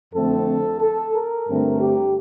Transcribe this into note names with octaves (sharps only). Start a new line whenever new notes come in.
F2 D3 A3 C4 A4
A4
A#4
G2 D3 A3 C4
G4